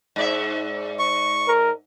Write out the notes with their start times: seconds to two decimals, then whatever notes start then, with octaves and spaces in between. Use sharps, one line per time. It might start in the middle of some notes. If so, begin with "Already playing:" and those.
0.16 G#2 D5 E5
0.99 C#6
1.48 A#4